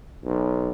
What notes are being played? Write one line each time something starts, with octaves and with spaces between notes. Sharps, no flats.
B1